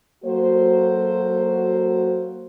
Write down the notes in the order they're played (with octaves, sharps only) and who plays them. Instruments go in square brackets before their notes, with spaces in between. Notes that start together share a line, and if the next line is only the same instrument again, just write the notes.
[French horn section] F#3 A#3 F#4 A4 C5